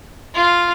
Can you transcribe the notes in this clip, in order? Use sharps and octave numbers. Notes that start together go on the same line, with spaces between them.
F4